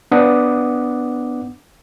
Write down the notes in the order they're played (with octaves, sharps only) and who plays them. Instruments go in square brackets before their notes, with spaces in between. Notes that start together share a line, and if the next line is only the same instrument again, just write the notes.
[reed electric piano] B3 D4 F#5 D6 D#6